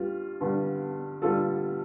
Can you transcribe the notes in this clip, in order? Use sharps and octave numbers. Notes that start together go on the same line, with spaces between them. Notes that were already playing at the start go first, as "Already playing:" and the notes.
Already playing: G2 G3 F4
G2 D3 G3
G2 D3 G3 F4 A4